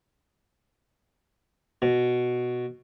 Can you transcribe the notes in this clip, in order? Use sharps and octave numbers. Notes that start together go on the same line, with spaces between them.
B2